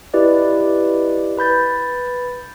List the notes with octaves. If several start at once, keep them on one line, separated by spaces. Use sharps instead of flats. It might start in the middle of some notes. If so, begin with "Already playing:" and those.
E4 G4 B4 D5 D#5
B4 B5 G6 A6